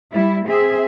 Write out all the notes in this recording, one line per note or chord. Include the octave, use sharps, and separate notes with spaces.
G3 E4
C4 G#4 E5